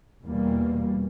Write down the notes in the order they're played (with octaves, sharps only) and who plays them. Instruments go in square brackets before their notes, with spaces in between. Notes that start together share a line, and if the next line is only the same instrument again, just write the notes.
[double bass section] E2 B2 G3 A#3